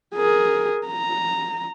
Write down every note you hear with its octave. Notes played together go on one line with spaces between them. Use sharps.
G#4 A#4
A#5